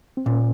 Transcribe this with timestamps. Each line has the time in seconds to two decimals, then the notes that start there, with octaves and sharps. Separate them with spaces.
0.17 C4
0.26 A#2 A#3 C#4